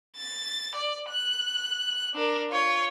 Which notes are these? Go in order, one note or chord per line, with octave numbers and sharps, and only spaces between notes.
A6
D5
F#6
D4 A#4
F4 C#5